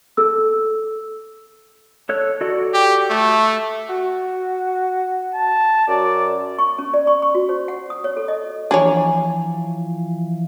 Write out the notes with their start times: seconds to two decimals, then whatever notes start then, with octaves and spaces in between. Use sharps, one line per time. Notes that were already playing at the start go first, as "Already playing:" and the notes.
0.17 A4 E6
2.09 A4 C#5 F#6
2.41 F#4 A4 D5
2.74 G4
3.10 A3
3.89 F#4
5.35 A5
5.88 F#2 D5
6.59 C#6
6.79 C#4
6.94 D5
7.07 C#6
7.22 C#6
7.35 F#4
7.49 C5
7.68 F#5
7.90 D#6
8.04 C#5
8.17 A4
8.28 D#5
8.71 E3 F3 A#3 D4 G#4 C#5 G#5